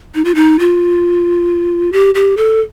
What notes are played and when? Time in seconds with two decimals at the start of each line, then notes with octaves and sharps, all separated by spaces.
0.15 D#4
0.25 F4
0.35 D#4
0.59 F4
1.92 G4
2.15 G4
2.37 A4